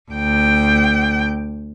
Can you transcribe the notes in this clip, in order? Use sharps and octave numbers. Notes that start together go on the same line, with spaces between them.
D2 G5